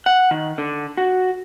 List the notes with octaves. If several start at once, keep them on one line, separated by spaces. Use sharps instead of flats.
F#5
D#3
D3
F#4